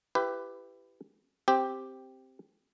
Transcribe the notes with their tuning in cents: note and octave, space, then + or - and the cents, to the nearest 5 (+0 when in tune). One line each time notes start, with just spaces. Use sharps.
E4 +25 G4 +0 B4 +20
C4 +0 G4 +0